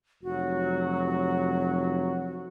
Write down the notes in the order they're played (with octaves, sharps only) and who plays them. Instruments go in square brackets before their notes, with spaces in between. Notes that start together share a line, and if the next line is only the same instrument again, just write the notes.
[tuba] F1 [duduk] F#3 [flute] F#4